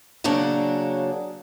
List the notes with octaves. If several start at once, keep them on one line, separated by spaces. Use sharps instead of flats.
C#3 F#3 A#3 C#4 D4